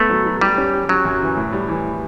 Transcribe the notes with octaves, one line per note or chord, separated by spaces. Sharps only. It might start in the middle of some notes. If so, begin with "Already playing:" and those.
Already playing: A3 B3
F#3
F#3
G3 G4
C#4
G4
F#3 C#4
F#2
E3
A2
G3
E3